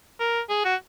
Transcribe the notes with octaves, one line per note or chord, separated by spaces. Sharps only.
A#4
G#4
F#4